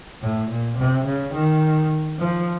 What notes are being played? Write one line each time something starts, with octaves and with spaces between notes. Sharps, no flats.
A2
A#2
C3
C#3
D#3
F3